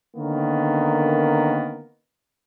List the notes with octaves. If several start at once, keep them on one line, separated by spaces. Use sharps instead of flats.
D3 D#3 A#3 B3 C#4 A#4